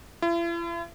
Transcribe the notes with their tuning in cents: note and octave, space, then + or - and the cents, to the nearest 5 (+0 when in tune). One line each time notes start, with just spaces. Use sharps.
E4 +45